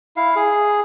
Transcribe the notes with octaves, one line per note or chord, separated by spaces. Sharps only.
E4 F5
G#4